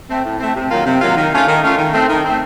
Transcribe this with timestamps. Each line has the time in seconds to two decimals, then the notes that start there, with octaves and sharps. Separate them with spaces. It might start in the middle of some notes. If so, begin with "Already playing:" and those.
0.09 A3 C4
0.24 A2
0.40 A3 C4
0.55 C3
0.71 D#3 F#3 A#3 F4
0.86 C3
1.01 D#3 F#3 A#3 F4
1.17 D#3
1.32 A3 C#4 F4
1.48 D#3
1.63 A3 C#4 F4
1.78 D#3
1.93 A3 C4
2.09 D#3
2.25 A3 C4